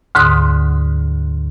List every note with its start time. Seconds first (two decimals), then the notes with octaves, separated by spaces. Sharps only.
0.15 D2 G#2 D3 C6 D#6